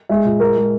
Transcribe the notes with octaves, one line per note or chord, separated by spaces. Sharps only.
G#3 E5
A#2
G#3 A#4
G#3